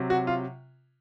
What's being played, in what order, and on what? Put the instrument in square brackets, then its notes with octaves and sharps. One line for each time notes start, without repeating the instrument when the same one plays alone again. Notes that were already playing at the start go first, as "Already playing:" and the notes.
Already playing: [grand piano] C3 F#3
F#4
F4